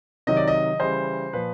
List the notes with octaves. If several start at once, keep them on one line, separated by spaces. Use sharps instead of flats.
C3 D#3 F#3 D#5
D5
D#5
C#3 E3 G3 C5
A#2 F3 B4